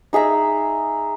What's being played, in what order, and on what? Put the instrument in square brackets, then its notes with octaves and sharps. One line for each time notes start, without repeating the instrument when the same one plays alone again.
[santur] D#4 G#4 E5 A#5